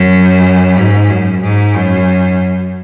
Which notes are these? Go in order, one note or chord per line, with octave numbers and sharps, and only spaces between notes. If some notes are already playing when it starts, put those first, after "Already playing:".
Already playing: F#2
G#2
F#2
G#2
F#2